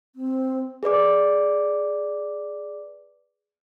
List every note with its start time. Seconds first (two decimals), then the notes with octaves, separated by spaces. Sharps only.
0.16 C4
0.83 G#4 B4 D5 D6